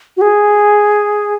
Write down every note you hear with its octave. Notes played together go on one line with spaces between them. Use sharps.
F#4
G#4